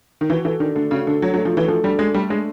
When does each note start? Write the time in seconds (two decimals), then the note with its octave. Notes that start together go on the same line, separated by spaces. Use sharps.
0.21 D#3
0.30 E3 F#4
0.45 E3 A4
0.60 D#3 D4
0.75 D3 A3
0.91 C#3 F#4
1.07 D3 A4
1.22 F#3 D4
1.34 F#3
1.38 A3
1.45 F3
1.53 E3 F#4
1.68 F3 A4
1.84 G3 D4
1.99 G#3 A3
2.14 G3 A3
2.30 G#3 D4